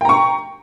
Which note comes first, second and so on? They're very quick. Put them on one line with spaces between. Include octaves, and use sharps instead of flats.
G5 A#5 C#6